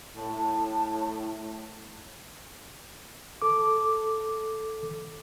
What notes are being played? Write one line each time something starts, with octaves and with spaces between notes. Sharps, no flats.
A2 A5
A4 D6